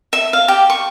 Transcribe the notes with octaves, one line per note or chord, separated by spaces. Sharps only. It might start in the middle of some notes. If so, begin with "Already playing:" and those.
E5
F5
G4
C#6